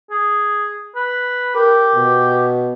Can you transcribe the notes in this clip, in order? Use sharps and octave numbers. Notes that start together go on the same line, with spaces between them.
G#4
B4
G4 A#4
B2